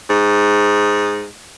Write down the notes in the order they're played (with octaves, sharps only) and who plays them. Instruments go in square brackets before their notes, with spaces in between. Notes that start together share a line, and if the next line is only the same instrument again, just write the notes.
[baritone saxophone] G#2